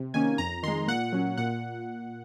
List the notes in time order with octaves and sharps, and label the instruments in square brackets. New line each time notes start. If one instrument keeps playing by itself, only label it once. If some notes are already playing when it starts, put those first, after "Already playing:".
Already playing: [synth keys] C3
D#3 A#3 C#4 G#5
F2 A#5
D#3 G#3 C6
A#2 F#5
F#3 C#4
A#2 F#5